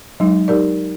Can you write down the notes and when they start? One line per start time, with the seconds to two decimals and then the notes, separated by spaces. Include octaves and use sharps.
0.20 F#3 G#3 D#4
0.48 D#4 G4 A#4 D5